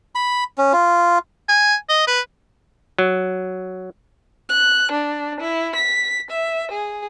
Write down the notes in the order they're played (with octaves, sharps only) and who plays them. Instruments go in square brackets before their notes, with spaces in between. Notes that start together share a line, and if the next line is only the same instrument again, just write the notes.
[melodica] B5
C#4
F4
[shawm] G#5
D#5
B4
[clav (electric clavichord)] F#3
[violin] F#6
D4
E4
B6
E5
G#4